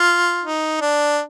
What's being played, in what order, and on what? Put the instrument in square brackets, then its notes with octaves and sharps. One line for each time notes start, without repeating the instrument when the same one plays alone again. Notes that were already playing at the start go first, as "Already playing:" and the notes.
Already playing: [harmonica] F4
D#4
D4